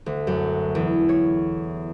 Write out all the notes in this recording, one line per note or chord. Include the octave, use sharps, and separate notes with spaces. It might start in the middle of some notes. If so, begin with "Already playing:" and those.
D2
F#2
E2
C#5